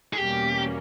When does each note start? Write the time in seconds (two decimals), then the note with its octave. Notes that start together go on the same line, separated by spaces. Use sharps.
0.13 G#4
0.16 E2 B2 G3 A#3 C#4 G4